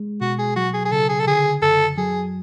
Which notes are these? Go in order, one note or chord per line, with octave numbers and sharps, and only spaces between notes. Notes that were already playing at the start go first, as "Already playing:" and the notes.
Already playing: G#3
B2 F#4
G#4
F#3 F#4
G#4
G#4
C#3 A4
G#4
A4
D3 G#4
F#2 A4
F#3 G#4